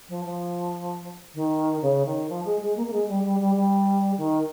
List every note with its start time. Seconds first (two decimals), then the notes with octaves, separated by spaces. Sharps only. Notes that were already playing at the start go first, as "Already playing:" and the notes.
0.09 F3
0.25 F3
1.34 D#3
1.81 C#3
2.05 D#3
2.29 F3
2.45 G#3
2.61 G#3
2.76 A#3
2.86 A#3
2.92 G#3
3.08 G3
3.23 G3
3.39 G3
3.55 G3
4.17 D#3